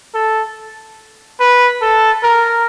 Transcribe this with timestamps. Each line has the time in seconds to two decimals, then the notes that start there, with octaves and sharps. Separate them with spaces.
0.14 A4
1.40 B4
1.82 A4
2.23 A#4